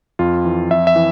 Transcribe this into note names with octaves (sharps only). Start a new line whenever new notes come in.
F2 F4
E3
F2 E5
E5
E3